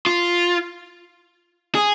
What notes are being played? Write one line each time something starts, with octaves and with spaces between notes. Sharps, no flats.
F4
G#4